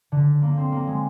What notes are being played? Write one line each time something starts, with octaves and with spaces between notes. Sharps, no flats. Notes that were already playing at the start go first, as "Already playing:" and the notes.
D3
A#3
C4
A#3
G#3